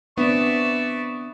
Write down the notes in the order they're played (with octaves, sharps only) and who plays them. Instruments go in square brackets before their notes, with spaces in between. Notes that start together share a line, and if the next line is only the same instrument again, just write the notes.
[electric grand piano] B3 [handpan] C4 D4 [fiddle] D5 E5 [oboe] C#6